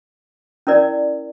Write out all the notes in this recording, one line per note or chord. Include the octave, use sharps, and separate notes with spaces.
C#4 E4 A#4 D5